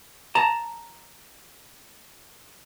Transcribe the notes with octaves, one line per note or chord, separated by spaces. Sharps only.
A5 A#5